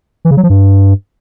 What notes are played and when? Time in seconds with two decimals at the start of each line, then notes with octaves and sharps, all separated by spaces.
0.25 E3
0.31 C#3
0.37 F#3
0.43 F3
0.50 G2